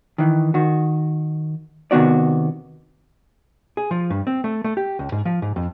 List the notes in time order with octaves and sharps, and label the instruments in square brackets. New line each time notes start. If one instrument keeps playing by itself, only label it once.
[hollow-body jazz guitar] D#3 E3
D#3 F#4
C3 D#3 B3 F#4 D5
G#4
F3
G2
C4
A3
A3
G4
C#2
G#2
F3
G#2
F2